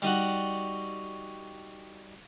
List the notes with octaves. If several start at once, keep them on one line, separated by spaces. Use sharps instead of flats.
G3 D#4 F#4